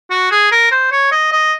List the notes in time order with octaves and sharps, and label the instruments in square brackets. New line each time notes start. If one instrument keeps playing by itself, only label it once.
[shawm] F#4
G#4
A#4
C5
C#5
D#5
D#5